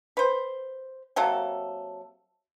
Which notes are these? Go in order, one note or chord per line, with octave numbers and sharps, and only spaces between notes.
B4 C5
C3 F#3 A#3 A4